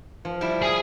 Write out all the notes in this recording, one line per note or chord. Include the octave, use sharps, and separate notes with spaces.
F3
G3 E4
G#4